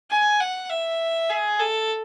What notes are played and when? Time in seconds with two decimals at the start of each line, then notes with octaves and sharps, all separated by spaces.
0.11 G#5
0.40 F#5
0.70 E5
1.30 G#4
1.59 A4